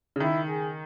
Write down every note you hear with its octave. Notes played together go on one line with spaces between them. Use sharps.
C#3
D#3 E4
G#4